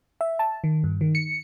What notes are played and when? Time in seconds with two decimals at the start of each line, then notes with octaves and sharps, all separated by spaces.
0.21 E5
0.39 A5
0.64 D#3
0.84 G2
1.01 D#3
1.15 C#7